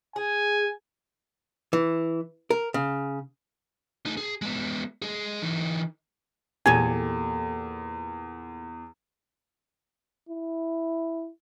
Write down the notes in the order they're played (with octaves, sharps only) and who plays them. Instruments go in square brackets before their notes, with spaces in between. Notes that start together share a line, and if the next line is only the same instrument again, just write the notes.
[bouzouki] G#4 [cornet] G#5
[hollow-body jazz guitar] E3
A#4
C#3
[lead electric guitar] A3 D#4
G#4
G#3 B3
G#3 G#4
E3 D#4
[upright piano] E2 [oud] A#2 G4 A4 [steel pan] G#5
[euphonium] E4